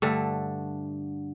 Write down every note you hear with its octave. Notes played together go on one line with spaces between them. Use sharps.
G2 D3 A3